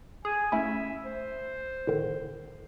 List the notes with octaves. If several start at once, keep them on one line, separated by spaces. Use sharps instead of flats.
G#4 G#5
A3 C#4 E4 E5
C5
A2 D3 D#3